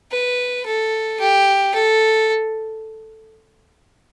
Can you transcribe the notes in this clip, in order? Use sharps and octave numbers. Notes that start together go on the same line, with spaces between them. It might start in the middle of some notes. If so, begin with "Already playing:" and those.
B4
A4
G4
A4